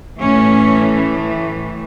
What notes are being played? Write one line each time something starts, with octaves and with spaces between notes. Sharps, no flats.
A2 E3 A3 C#4